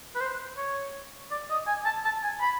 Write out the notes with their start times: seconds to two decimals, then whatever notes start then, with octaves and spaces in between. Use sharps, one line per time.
0.15 B4
0.20 C5
0.57 C#5
1.31 D5
1.50 D#5
1.67 G#5
1.85 A5
2.04 A5
2.23 G#5
2.41 B5